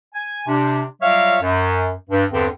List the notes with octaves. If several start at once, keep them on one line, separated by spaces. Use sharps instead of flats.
G#5
C3 D4
F#3 G3 F4 C#5 E5 F5
F#2
G2
E2 G2 D3 C4